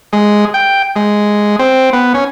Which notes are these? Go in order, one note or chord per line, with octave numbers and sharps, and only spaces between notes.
G#3
G5
G#3
C4
B3
C#4